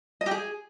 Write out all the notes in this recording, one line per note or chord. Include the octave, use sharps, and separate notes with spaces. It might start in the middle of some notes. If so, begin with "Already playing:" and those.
D#5
G4
G#4